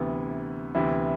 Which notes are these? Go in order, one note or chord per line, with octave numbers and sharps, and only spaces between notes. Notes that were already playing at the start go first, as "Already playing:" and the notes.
Already playing: D2 C3 E3 B3
D2 C3 E3 B3 E4